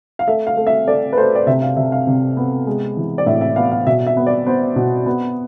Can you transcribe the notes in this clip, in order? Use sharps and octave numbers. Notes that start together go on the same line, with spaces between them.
F5
A3 E5
F5
A3
E5
A3 D5
B4
A3 C5
D5
C3 E5
F5
C3 E5
F5
C3
B3
G#3
E3
D5
A2 E5
E5
B3 F5
F5
B2 E5
E5
B3
D5
B3 C5
B2
B3